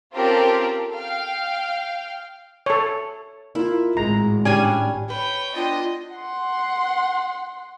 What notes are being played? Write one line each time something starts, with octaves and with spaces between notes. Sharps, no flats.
C4 C#4 F4 G4 A4 A#4
F5 G5
A4 C#5
A#3 E4 F4
G#1 A2 G#3 A#5
G3 C#4 D4 G#5
B4 C#5 G5
B3 D4 F4 D#5 G5
F#5 C6